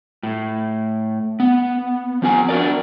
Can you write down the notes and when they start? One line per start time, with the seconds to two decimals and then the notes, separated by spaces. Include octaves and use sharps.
0.23 A2
1.40 B3
2.22 F3 C4 G#5
2.49 D4 F#4 A#4 D5